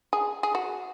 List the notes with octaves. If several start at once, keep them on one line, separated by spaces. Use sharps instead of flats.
G#4
G#4
F#4